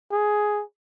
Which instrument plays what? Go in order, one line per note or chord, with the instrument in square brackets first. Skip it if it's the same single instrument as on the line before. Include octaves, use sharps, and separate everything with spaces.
[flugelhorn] G#4